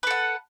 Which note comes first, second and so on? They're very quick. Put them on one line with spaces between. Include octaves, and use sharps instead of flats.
B4 A4 F#5